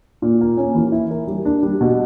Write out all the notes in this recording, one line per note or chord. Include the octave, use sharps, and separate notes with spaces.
A#2
A#3
C#4
E3
E4
A#4
G3
D4
G3
B2